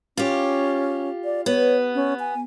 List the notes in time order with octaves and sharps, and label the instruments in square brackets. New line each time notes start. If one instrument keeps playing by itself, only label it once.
[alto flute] C#4 [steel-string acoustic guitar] F4 G4
[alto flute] D5
[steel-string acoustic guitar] B3 [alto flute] C#5
[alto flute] C#4
G#5